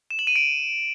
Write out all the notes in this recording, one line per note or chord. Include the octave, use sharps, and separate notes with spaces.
E7
F#7
D#7
D7